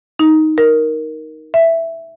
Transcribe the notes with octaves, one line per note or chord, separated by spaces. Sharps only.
D#4
A#4
E5